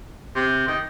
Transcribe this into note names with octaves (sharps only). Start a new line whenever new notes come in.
C3
D#3